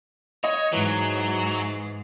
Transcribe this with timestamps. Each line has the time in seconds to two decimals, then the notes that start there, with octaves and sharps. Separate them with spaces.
0.44 C#5 D#5
0.73 G#2 E3 F#3